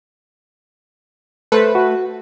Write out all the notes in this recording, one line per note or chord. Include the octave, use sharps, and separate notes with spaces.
A3 A4 B4 C5
F#4